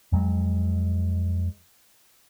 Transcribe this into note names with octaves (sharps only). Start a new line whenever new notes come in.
F2 F#3 G#3